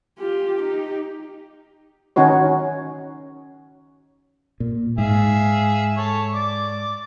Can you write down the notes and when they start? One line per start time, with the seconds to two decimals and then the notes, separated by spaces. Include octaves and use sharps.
0.19 F4 G4
0.61 D#4 G4
2.16 D#3 C#4 D#4 F#4 C#5
4.60 A#2
4.98 G#2 G#4 E5 F5
5.97 A4 C#5
6.34 D5